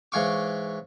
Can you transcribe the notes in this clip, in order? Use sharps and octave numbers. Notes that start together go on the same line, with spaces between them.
G#2 E3 C#5 F5 C#6 D6